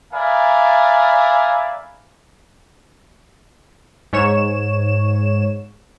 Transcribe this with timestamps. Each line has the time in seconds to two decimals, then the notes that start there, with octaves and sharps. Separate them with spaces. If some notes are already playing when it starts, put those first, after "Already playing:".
0.13 A#4 B4 D5 E5 F5 G#5
4.13 G#2 C#5 E7